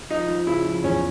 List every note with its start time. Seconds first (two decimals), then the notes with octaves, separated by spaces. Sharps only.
0.10 F3 D#4
0.28 F3
0.47 C#3 E4
0.66 F3
0.84 E2 C#4